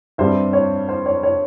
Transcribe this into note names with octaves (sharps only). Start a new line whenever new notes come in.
G2 G3 C4 C5 E5
C#5
C5
C#5
C#5